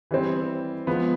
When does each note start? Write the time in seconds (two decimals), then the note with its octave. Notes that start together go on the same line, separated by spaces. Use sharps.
0.11 E3 G3 C4
0.87 F3 G#3 B3